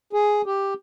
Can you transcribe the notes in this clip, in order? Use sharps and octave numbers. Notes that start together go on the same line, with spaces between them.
G#4
G4